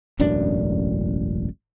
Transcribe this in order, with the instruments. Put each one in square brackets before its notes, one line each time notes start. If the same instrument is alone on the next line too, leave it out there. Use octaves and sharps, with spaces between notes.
[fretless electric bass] E1 A1 F#2 D4